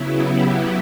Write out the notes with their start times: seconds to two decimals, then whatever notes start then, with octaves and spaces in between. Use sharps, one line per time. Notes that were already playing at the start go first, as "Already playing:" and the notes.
Already playing: C#3 F#3 B3 E4
0.22 G4